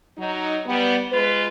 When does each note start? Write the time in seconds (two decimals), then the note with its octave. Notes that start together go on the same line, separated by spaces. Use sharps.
0.18 F#3 D#4
0.66 G3 B3
1.12 G#3 F4 B4